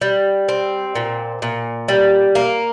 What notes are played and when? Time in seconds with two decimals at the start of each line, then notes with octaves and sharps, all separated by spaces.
0.02 G3
0.49 C4
0.95 A#2
1.42 A#2
1.88 G3
2.35 A#3